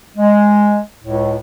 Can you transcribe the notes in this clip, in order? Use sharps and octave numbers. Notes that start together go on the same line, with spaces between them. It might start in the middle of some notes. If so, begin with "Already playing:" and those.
G#3
C#2 A2